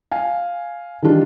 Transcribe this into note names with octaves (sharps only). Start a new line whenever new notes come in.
F5 G#5
D#3 E3 G3 D4 F4